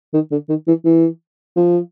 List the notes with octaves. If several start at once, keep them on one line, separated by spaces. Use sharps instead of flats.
D#3
D3
D#3
E3
E3
F3